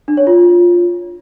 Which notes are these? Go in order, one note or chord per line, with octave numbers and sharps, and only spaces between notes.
D4
C#5
F4